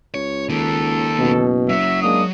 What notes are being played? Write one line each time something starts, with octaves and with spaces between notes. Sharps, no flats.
C#2 C#5
D#3 A#3 A4
F#1 B2
F#3 E5
G#3 A#3 D4 D#6